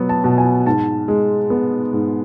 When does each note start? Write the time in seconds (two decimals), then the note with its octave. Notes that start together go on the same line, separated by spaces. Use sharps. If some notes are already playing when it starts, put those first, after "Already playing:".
Already playing: B2 F#3 B3
0.09 A5
0.24 B2
0.38 G#5
0.66 G#2 A5
1.08 G#3
1.50 B3
1.93 G#2